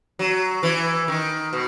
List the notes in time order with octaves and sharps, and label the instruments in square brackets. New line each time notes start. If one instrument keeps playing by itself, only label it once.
[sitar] F#3
E3
D#3
B2